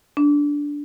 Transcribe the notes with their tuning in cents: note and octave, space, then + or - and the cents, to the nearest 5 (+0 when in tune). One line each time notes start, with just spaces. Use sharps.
D4 -10